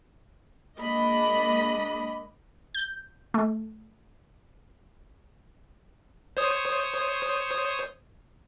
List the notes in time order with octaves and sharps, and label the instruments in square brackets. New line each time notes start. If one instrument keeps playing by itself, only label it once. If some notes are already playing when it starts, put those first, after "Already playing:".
[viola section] G#3 A#3 D4 D#5 B5
[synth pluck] G6
A3
[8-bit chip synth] C5 C#5 D#6